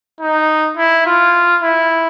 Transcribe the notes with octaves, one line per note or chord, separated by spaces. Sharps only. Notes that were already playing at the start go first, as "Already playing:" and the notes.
D#4
E4
F4
E4